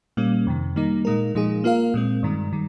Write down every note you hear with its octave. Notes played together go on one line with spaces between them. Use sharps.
A#2 G3 A#3 C#4
F2 C3 D#3
D#3 G3 A#3 D#4
A#2 G#3 D#4 A#4
A#2 F3 G#3 D#4 G#4
A#3 F4 A#4 F5
A#2 G#3 C4
G2 D#3 G#3
D#3 G3